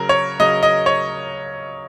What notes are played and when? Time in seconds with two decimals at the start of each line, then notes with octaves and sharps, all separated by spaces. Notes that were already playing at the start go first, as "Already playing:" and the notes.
Already playing: C#3 F#3 A#4
0.09 C#5
0.40 C#3 F#3 D#5
0.63 D#5
0.86 C#5